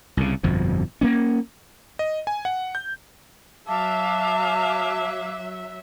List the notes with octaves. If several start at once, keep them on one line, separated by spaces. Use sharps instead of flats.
C2 C#3
G1 F2 B2 F3
A#3 B3 C#4
D#5
G#5
F#5
G6
F#3 E5 F5 A5 D6